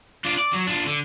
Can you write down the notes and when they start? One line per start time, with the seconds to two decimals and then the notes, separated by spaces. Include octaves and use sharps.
0.25 D4 F4
0.39 D5
0.53 F#3
0.67 D4 F4
0.87 D3